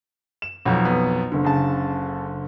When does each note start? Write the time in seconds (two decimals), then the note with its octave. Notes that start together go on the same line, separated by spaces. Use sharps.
0.42 E7
0.65 B1 F2
0.85 B3
1.32 F#1 D3
1.44 C#3 A5